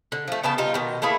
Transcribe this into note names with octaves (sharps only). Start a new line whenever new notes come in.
D3
F3 A3
C#3 B3 G5 A5
G3 D#4 F4
B2 D#3
A3 A#3 E4 G#4